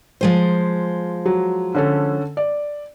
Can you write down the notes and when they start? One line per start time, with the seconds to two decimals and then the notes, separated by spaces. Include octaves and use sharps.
0.21 F3 G#3 C5
1.26 F#3
1.75 D3 C#4 A4
2.37 D5